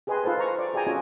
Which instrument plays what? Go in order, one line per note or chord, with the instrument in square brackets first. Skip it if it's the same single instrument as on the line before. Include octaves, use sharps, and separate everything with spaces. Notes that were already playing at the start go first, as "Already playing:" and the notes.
[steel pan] G4 G#4 B4 D#5 G#5 C6
D#4 F4 A4 B4 C5 A5
C5 A#5 C#6
D5
F#4 G#4 D5 G5 G#5 A#5
C#4 F4 F#4 A4 D#5